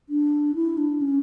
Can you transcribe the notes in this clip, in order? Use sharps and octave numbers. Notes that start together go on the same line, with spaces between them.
D4
E4
D4
C#4